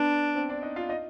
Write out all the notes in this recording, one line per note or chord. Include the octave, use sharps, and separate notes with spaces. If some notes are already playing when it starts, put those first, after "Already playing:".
Already playing: B3 D4 B4
C4 C5
D4 D5
D#4 D#5
F4 F5
D#4 D#5